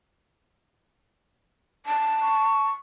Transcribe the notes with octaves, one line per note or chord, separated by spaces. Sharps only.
A5
C#6